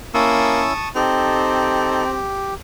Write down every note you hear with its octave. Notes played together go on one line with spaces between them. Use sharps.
A#3 C#4 E4 A5 C#6 D#6 E6
C4 D#4 G4 A4